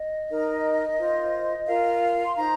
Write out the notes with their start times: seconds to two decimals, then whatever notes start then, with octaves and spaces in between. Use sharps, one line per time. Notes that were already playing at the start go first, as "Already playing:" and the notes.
Already playing: D#5
0.29 D#4 A#4
0.98 F4 C5
1.66 F4 A#4 F5
2.24 C6
2.35 D#4 C5 A#5